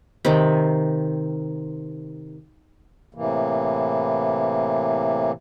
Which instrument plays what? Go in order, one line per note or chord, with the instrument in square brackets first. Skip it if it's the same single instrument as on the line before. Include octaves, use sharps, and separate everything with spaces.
[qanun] C3 D#3
[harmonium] A2 C3 E3 A#3